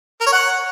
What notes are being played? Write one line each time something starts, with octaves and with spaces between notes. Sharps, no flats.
A#4
C#5
F#5